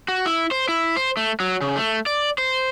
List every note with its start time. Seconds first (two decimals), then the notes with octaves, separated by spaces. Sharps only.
0.08 F#4
0.26 E4
0.51 C5
0.69 E4
0.96 C5
1.17 A3
1.40 F#3
1.61 C#3
1.76 A3
2.06 D5
2.38 C5